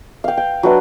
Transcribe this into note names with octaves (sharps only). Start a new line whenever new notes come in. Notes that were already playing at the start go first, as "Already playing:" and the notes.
F5 G5
G5
F#3 D4 B4 E5